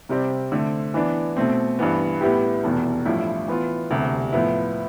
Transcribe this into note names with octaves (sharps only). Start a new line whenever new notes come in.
C3 G3 C4 G4 D5
D3 A3 C4
E3 B3 D4
B2 A3 C4
G2 E3 B3
A2 G3 B3 E4 G4
F1 E2 B2
A1 G2 F3 A3 E4
E3 B3 F4
E1 D2 C3 G3
A2 F3 B3 E4